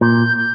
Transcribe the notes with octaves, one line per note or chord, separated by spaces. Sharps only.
A#2 G6
G6